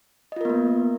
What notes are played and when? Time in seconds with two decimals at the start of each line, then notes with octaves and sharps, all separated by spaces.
0.32 D#5
0.36 F4
0.41 A#4
0.45 B3
0.49 A#3